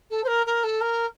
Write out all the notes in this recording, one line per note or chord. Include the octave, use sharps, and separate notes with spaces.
A4
C5
A#4
A#4
A4
A#4